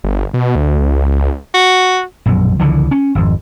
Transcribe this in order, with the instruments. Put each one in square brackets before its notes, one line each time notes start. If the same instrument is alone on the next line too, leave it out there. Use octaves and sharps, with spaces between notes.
[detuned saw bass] G1
B2
D2
C#2
[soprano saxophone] F#4
[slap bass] A#1 F#2 B2
C#2 D3 E3 F3
C#4
G#1 F2